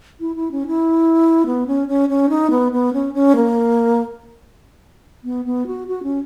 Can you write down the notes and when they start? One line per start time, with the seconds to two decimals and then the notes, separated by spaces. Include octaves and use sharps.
0.20 E4
0.36 E4
0.51 C#4
0.67 E4
1.46 B3
1.67 C#4
1.88 C#4
2.09 C#4
2.29 D#4
2.51 B3
2.72 B3
2.93 C#4
3.14 C#4
3.36 A#3
5.24 B3
5.45 B3
5.67 F#4
5.88 F#4
6.03 C#4